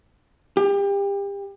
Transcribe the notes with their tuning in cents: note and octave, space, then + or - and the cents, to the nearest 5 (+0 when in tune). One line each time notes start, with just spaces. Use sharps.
G4 +30